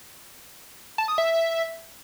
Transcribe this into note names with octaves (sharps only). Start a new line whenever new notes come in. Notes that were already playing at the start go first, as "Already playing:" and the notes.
A5
D#6
E5